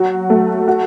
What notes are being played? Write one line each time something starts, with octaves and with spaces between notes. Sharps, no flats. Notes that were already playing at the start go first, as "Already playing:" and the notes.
Already playing: F#3 F#4
A3
F#4